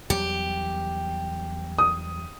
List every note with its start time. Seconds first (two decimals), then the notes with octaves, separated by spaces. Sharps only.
0.10 E2 F#3 G3 G4
1.79 D#6